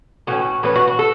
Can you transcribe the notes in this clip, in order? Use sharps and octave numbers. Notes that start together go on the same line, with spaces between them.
A2 E3 A3 C#4 F#4
A2 E3 A3 C#4 B4
F#4
F#4
A4